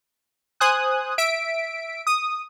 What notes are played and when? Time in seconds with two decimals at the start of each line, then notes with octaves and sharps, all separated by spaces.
0.60 C5 G#5 D#6 F#6
1.18 E5 B6 D7
2.07 D#6